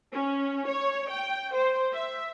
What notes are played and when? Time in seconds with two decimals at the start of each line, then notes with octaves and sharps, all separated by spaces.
0.13 C#4
0.68 C#5
1.10 G5
1.54 C5
1.93 E5